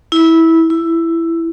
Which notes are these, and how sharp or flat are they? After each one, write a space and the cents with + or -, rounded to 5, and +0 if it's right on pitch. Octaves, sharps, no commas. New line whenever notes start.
E4 -15
E4 +10